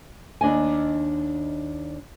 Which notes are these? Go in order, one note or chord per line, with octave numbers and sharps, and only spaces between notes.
D#2 D4 D#5 G#5